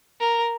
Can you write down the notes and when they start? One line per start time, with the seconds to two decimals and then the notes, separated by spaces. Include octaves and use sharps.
0.20 A#4